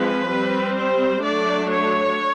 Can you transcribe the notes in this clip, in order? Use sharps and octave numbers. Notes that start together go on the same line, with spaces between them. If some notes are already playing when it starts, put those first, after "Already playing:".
Already playing: F3 G#3 C4 B4
G3 C4
C5
F#3 A3 D4 D5
C#5